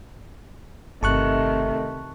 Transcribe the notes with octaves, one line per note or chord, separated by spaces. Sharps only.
G1 C3 D#3 A3 A5 C#6 F#6